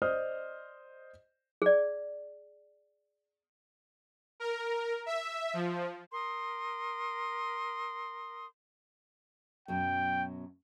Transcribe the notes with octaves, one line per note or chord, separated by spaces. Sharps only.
C5 D5 D#5 D#6 F6
G#4 D5
A#4
E5
F3
A#4 C6 D#6
F#2 B2 F#3 G5